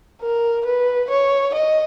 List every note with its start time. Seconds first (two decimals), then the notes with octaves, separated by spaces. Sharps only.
0.22 A#4
0.65 B4
1.10 C#5
1.54 D#5